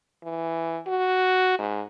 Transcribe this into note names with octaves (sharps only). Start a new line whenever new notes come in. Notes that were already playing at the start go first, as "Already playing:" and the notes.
E3
F#4
G#2